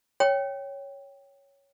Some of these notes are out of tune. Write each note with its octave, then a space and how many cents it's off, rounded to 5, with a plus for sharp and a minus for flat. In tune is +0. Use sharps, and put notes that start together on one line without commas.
C#5 +0 G5 +0